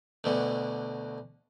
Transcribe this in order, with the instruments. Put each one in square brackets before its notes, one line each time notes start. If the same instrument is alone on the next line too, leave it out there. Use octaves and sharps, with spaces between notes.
[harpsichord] D2 B2 D3